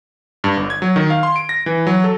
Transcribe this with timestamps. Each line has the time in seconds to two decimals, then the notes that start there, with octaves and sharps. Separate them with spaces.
0.44 G2
0.57 G1
0.70 G#6
0.82 F#3
0.96 D#3
1.10 F5
1.23 C6
1.36 D7
1.49 A#6
1.66 E3
1.87 F#3
2.04 A4